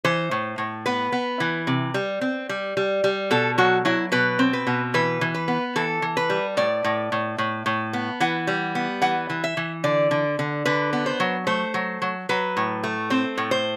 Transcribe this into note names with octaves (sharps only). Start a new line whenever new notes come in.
E3 C5
A2
A2
B3 B4
B3
E3
C3
G3
C4
G3
G3
G3
B2 A4
F#3 F#4
F#3 E4
B2 B4
C4
B4
B2
E3 B4
E3
B4
B3
E3 A4
E3
B4
G3
A2 D5
A2
A2
A2
A2
B3
E3 F#5
G3
B3
E3 F#5
E3
E5
E3
D3 D5
D3
D3
D3 B4
B3
C5
F#3
A3 C5
F#3
F#3
F#3 B4
A2
A3
C4 C5
A2
C5